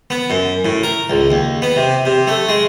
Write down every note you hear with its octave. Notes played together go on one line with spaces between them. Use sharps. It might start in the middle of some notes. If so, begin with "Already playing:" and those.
B3
F#2
A2
A#4
C#2
D#2
B3
C3
C3
A3
G#3